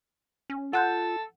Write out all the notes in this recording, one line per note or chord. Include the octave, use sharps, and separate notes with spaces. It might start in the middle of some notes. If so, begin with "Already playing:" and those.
C#4
F4 A4 F#5 F#6 G6